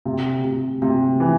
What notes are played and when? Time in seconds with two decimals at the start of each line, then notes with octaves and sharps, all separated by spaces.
0.05 C3
0.44 C3
0.82 C3
1.20 E3